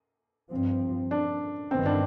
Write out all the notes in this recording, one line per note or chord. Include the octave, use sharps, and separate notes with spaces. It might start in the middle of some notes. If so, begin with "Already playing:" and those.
G2 F3 C4
D4
G1 G2 D#3 B3 C4
D4